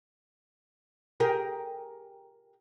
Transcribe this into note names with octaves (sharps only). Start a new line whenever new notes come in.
G4 G#4 A#4